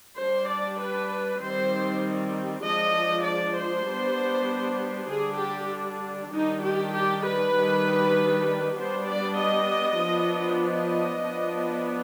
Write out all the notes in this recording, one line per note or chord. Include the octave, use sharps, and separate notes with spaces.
G3 D4 C5
D5
B4
D#3 G3 C4 C5
F3 G#3 D4 D#5
D5
C5
G3 B3 D4
D3 G3 D4 G#4
G4
D#3 G3 D4 D#4
G4
G4
B4
D#3 G3 D4
G3 B3 D4 C5
D5
D#5
F3 B3 D4
D#5
F3 B3 D4